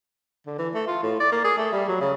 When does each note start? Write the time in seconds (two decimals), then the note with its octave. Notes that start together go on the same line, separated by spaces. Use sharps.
0.46 D3
0.58 E3
0.74 A3
0.88 F4
1.03 A2
1.20 D5
1.32 A#3
1.44 G#4
1.58 A3
1.73 G3
1.88 F#3
2.01 C#3